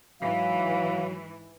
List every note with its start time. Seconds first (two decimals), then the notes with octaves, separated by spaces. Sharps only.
0.21 G#2 E3 F#3 F5